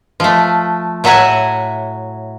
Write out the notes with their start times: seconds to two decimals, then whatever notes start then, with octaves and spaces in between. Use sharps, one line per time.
0.20 F3 A3
1.04 A2 F#3 F#4 E5 F#5 G#5